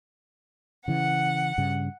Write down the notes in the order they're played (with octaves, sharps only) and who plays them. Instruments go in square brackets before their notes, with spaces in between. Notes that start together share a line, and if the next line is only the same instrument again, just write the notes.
[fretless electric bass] C#3 E3 [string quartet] F#5
[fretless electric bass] G2 C#3